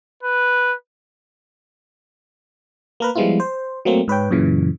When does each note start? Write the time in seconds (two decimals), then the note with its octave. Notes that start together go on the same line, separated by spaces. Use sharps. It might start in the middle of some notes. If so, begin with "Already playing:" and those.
0.23 B4
3.00 A#3 A#4 B4
3.15 F3 G3 G#3 B3 E4 F4
3.40 C5
3.85 F#3 A3 A#3 C4
4.08 G#2 B4 C#5 G5
4.31 F#2 A#2 C#3 E3